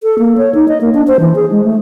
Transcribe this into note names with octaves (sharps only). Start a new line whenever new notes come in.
A4
A#3
C#5
D#4
D#5
A#3
D4
C5
E3
G#4
G#3
A3